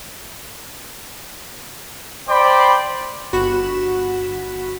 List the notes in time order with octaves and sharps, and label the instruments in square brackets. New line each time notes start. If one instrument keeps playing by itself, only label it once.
[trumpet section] C5 D5 G5 B5 C6 D6
[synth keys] G1 F#4 B5 E7